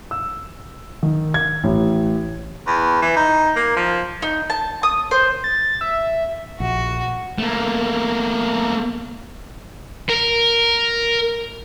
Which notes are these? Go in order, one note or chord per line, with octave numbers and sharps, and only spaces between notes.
E6
D#3
G#6
A1
E2
E3
D#4
A#3
F3
D#4
A5
D#6
C5
A6
E5
A#1 F#4
A3 A#3
A#4